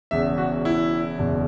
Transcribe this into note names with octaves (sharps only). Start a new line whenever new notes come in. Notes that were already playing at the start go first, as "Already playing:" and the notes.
E1 E2 C#3 E5
F#4
E4
F#1 E2 B2 G#3